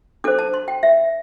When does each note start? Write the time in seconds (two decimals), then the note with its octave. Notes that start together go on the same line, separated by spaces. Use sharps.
0.24 D4 A4 C5 D6
0.39 A5
0.54 C6
0.68 G5
0.83 E5